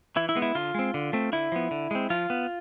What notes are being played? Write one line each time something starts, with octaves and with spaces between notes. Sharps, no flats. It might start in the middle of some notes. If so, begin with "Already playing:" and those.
E3 E4
E4
G#3 B3
E4
D3 F4
G#3 C4
D3
A3 C4
D3 E4
F3 B3
D3
G#3 C4
F3 F4
B3